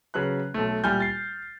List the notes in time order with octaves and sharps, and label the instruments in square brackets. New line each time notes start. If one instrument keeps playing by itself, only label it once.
[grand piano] C#3 F#3 B4 F#6
B1 A3
A#2 G3 E4 G#5 F6 G6
A6 C7